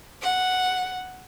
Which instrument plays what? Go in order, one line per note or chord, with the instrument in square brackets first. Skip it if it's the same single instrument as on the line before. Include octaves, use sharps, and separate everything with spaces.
[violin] F#5